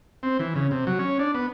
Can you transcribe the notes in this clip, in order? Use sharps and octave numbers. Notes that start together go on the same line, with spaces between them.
C4
E3
C#3
C3
F#3
C#4
D4
B3